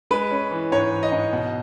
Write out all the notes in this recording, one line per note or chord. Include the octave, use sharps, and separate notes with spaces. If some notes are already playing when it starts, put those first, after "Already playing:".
G#3 B4
C#4
E3
G#2 C#5
E3
D#5
G#2
B2